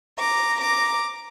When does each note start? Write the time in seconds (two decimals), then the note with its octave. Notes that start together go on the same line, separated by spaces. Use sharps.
0.19 A#5 D6
0.61 A#5 D6